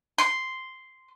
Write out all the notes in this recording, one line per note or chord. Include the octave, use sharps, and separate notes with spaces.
C6